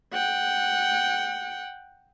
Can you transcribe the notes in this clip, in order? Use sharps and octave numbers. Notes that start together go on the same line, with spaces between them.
F#5 G5